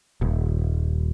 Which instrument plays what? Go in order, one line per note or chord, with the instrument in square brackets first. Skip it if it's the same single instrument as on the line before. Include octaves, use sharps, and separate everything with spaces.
[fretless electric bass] D#1